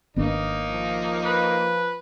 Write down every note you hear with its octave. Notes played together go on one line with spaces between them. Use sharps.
G#1 A#3 B3 D4 D#4
F3
B4